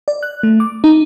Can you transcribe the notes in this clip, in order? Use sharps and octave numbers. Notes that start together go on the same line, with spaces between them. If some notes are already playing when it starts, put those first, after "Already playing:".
D5
F#6
A3
D6
D#4